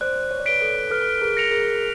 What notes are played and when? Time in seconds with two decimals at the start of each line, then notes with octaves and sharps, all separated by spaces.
0.01 C5 D5 F#6
0.31 C#5
0.40 D5
0.46 B4 C#5 B6 D7 G7
0.61 A4 B4
0.91 A4 B4 F6
1.21 G#4 A#4
1.37 A#6 C#7 F7
1.51 G#4 A#4